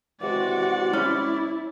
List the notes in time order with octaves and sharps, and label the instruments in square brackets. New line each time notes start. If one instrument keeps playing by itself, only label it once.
[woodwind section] C3 E3 G#3 [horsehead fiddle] F#4 [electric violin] D5
[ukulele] C#4 [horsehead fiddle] E4